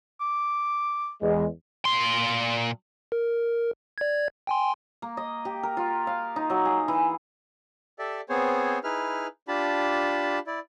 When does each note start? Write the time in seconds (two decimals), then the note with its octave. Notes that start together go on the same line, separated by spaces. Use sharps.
0.21 D6
1.21 E2 G#3
1.85 A#2 C6
3.12 A#4
3.98 D5 G#6
4.47 G5 G#5 C6
5.02 A#3
5.17 D#5
5.45 G4
5.63 A#4
5.77 F4
6.07 F5
6.36 D#4
6.50 F#3
6.65 G#4
6.88 E3
7.99 G4 A4 D5 E5
8.29 B3 C4 G#4 C5 C#5
8.84 D#4 E4 G#4 B4 F6
9.48 D4 F4 G4 A5 B5
10.47 E4 D5